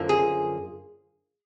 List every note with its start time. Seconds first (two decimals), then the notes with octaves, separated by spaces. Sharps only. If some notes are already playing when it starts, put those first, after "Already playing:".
Already playing: F#2 D3 F3 A#3
0.09 G#4